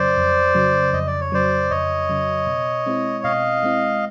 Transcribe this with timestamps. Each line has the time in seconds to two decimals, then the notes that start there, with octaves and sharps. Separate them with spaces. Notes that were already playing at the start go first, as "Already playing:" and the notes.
Already playing: F2 C#3 F#3 C5 D5
0.17 F2
0.55 C#3 F#3
0.93 F2 D#5
1.07 D5
1.21 C#5
1.32 C#3 F#3 C5 D5
1.71 F2 C#5 D#5
2.09 C#3 F#3
2.47 B2
2.86 G#3 C4 E4
3.24 B2 D#5 F5
3.63 G#3 C4 E4